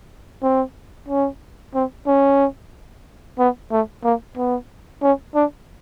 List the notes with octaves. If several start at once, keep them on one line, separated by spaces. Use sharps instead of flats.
C4
C#4
C4
C#4
B3
A3
A#3
B3
C#4
D4